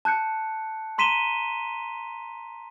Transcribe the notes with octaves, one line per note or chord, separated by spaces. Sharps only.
A5 F#6 G6 C#7
A#5 C6 B6 D#7 E7 G7